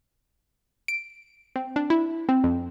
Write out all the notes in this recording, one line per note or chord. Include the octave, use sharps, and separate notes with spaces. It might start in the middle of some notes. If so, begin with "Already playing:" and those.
D7
C4
D4
E4
C4
F2